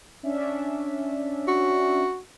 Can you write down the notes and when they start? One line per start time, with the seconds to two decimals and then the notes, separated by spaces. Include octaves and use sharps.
0.23 C#4 D4 E5
1.48 F#4